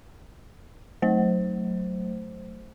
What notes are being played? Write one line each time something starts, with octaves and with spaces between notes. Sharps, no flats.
F#3 A3 C5